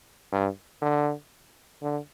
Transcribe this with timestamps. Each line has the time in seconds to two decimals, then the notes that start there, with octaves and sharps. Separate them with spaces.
0.32 G2
0.82 D3
1.82 D3